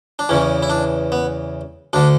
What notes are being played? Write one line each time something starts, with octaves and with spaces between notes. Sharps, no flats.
D4
E2 C#3 E3 C#4
E4
D4
B3
D2 D3 D4